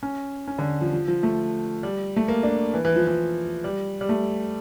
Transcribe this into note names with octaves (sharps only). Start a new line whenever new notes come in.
C#4
C#4
D3
F3
F3
F3
A3
G3
A3
A#3
D4
E3
E3
F3
E3
G3
G3
A3